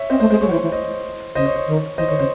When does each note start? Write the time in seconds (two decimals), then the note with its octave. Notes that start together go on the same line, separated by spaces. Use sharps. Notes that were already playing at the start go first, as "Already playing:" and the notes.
Already playing: C#5 E5
0.10 C4 C5 D#5
0.20 A3 C5
0.30 G#3 C5
0.41 G#3 C#5
0.47 F#3
0.51 E3 C5
0.62 E3
0.72 C5 D#5
1.35 C#3 C5 D#5
1.46 C#5
1.56 C#5
1.67 D#3
1.98 E3 C5 D#5
2.08 D#3 C#5
2.18 C#3 C5